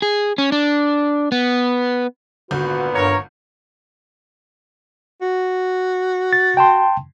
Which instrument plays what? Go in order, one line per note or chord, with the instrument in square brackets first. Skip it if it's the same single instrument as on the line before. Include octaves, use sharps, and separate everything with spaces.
[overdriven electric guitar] G#4
C#4
D4
B3
[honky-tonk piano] G#1 D3 G6 [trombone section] A#2 B3 B4 [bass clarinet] F#4
[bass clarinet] G2 [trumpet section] A#4 C#5
[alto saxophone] F#4
[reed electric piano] A6
G5 A5 C6